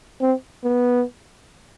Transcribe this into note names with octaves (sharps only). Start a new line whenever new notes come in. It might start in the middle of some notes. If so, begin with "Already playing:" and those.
C4
B3